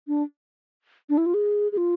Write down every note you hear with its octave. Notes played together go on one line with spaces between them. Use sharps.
D4
D4
E4
F4
G#4
G#4
F4